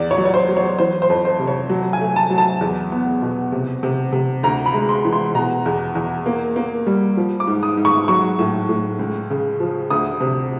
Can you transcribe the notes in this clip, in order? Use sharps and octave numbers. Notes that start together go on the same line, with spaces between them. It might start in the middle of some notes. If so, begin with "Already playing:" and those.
Already playing: E2 D5
C#5
F#3
C#5
C5
F#3
C#5
E3 C5
C5
F2
C5
C3
C#5
F#3
G#5
A3
A5
F#3
A5
E2
B3
B2
C3
C3
C3
D2 A#5
B5
G#3
C6
E3
C6
B2 A#5
E2
E2
A#3
A#3
G3
F3
D6
G#2
D#6
G#2
C#6
F#3 C#6
A2
A2
C#2
C#3
F3
D2 D#6
C3